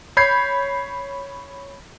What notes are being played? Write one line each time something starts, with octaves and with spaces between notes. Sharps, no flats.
C#5 B5 G6 G#6 C7